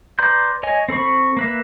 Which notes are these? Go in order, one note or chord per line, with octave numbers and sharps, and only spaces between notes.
B4 D5 A#5 C6 G6
C#5 D#5 G#5
C4 A4 B5 C#6
A#3 B4 E5